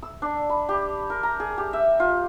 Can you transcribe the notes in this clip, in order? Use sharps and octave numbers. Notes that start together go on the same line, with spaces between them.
E6
D4
B5
G4
A#4
A#5
G#4
G4
E5
F4